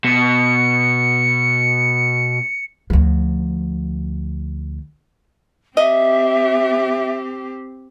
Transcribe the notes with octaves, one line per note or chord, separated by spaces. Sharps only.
B2 C#7
D2 F3
C4 G4 D#5 E5